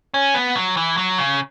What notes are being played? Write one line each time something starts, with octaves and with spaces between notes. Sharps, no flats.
C#4
B3
F#3
E3
F#3
C#3